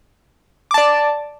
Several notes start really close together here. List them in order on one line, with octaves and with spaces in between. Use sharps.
D6 A5 D5